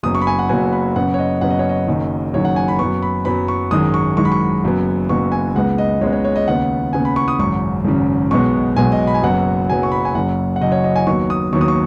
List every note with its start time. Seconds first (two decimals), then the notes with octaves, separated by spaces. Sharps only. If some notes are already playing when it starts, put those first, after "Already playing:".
0.03 F#1 F#2 F#3 B3 D#6
0.15 C#6
0.21 B5
0.27 G#5
0.39 F#5
0.49 F#1 F#2 F#3 B3 G#5
0.73 B5
0.96 F#2 C#3 B3 F#5
1.14 C#5
1.19 D#5
1.41 F#2 C#3 B3 F#5
1.50 D#5
1.59 C#5
1.69 D#5
1.87 F#1 F#2 D#3
2.33 F#1 F#2 D#3 C#5
2.45 F#5
2.56 G#5
2.68 B5
2.79 F#2 F#3 B3 C#6
3.03 B5
3.25 F#2 F#3 B3 B5
3.48 C#6
3.71 G#1 F#2 D#3 G#3 D#6
3.94 C#6
4.17 G#1 F#2 D#3 G#3 C#6
4.25 B5
4.32 C#6
4.64 F#1 F#2 F#3 B3
5.09 F#1 F#2 F#3 B3 C#6
5.32 G#5
5.55 C#2 C#3 G#3 B3 F#5
5.78 D#5
6.01 C#2 C#3 G#3 B3 C#5
6.13 C#5
6.25 C#5
6.36 D#5
6.48 D#2 C#3 B3 F#5
6.93 D#2 C#3 B3 G#5
7.05 B5
7.16 C#6
7.28 D#6
7.39 G#1 F#2 C#3 C#6
7.85 G#1 F#2 C#3
8.31 B1 B2 G#3 B3 C#6
8.76 B1 B2 G#3 B3 G#5
8.92 D#5
9.07 B5
9.14 G#5
9.23 F#1 F#2 F#3 B3 F#5
9.70 F#1 F#2 F#3 B3 G#5
9.83 C#6
9.92 B5
10.05 G#5
10.15 F#1 F#2 C#3 F#3 F#5
10.56 F#5
10.61 F#1 F#2 C#3 F#3 D#5
10.72 C#5
10.84 D#5
10.96 G#5
11.06 D#2 D#3 F#3 B3 C#6
11.30 D#6
11.53 D#2 D#3 F#3 B3 C#6
11.61 D#6
11.68 C#6